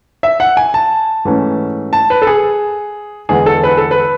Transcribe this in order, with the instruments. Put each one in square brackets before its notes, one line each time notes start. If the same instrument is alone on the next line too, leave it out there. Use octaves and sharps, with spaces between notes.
[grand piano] E5
F#5
G#5
A5
G#2 E3 A3 C#4
A5
B4
A4
G#4
E2 D3 G#3 B3 G#4
A4
B4
A4
B4